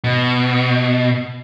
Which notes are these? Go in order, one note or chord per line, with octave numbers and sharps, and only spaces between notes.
B2